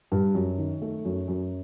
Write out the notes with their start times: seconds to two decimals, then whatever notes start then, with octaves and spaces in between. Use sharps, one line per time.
0.12 G2
0.35 F#2
0.58 D#3
0.82 A3
1.05 F#2
1.28 F#2